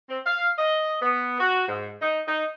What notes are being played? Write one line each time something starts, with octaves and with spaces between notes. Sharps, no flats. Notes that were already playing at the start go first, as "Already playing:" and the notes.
C4
F5
D#5
B3
F#4
G#2
D#4
D#4